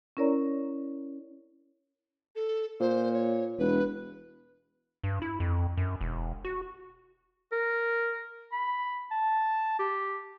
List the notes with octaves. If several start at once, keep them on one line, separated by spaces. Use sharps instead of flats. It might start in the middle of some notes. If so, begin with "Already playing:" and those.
C#4 E4 A#4 C#5 D5 A#5
A4
A#2 C5
C#5
E1 B4
G2
E4
F2
F#2
E1
F#4
A#4
B5
A5
G4